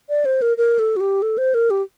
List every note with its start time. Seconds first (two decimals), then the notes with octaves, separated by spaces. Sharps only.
0.09 D5
0.25 C5
0.42 A#4
0.58 A#4
0.79 A4
0.96 F#4
1.01 G4
1.22 A4
1.38 C5
1.54 A#4
1.70 G4